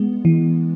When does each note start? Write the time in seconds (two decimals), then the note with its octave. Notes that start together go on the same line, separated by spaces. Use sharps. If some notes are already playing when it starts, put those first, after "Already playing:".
Already playing: G#3 B3
0.25 E3